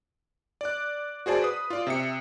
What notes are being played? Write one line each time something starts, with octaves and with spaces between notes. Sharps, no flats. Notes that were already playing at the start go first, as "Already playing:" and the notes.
D5 F#6
F#4 G#4 C5 D5 A5
B4 D#6
F4 D5
C3 E5 C#7